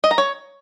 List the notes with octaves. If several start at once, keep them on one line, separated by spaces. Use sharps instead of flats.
D#5
A#5
C#5